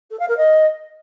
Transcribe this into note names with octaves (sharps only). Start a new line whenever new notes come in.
A4
F5
A#4
D#5